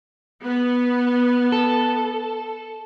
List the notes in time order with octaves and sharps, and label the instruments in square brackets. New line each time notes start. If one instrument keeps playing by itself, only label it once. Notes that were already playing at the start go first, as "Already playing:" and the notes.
[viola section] B3
[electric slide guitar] A4